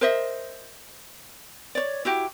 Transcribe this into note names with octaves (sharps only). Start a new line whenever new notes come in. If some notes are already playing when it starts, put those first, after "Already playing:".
A#4 C5 D#5 E5
C#5 D5
E4 F#4 G4